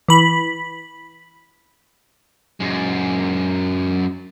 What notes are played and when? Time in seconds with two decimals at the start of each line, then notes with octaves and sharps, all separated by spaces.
0.08 E3 B5
2.60 F#2 G#3